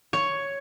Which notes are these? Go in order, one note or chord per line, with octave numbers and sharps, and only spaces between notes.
C#5